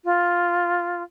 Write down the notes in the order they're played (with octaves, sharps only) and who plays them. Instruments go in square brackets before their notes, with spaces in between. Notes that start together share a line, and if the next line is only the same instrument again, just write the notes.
[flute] F4